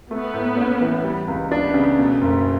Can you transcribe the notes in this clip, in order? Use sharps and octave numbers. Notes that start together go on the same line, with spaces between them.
A3 B3
A2
C#4
E3
G3
C#2
B3 D4
C#3
B2 A3
F#1